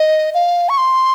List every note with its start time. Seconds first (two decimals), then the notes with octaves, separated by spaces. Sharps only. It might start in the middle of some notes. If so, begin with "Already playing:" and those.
Already playing: D#5
0.34 F5
0.69 C#6
0.78 C6